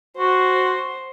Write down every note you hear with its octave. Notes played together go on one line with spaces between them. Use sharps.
F#4 C5